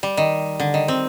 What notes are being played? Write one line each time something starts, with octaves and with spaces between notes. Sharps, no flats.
G3
D#3
D3
D#3
C4